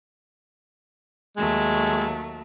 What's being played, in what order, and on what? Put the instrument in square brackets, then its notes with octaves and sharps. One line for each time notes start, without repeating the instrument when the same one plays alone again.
[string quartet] D#2 F#3 A3 [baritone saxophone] G#3